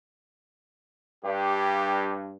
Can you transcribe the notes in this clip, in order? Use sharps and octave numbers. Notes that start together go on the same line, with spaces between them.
G2 G4